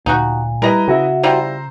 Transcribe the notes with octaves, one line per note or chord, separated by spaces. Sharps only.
D2 A#2 D#4 F#4
G3 E4 A#4 B4 D#5 A#5
C#3 F#4 E5
G3 E4 F4 C5 A#5 E6